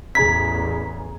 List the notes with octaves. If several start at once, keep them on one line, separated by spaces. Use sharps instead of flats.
A1 E2 G#4 A#5 G#6 B6